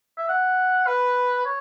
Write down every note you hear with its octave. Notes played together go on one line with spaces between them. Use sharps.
E5
F#5
B4
C#5